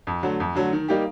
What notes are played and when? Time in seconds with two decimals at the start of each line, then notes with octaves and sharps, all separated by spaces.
0.07 F2
0.23 D3 F#3 A3
0.40 F2
0.55 D3 F#3 A3
0.72 D#3
0.88 G3 A#3 D#4 G4